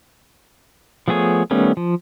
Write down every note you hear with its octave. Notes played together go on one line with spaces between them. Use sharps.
F3 A3 B3 G#4 C#5
D#3 G3 A3 B3 C#4
F3